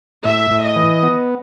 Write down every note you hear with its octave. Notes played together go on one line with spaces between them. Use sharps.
A2 E5
A2
D#5
E3
B3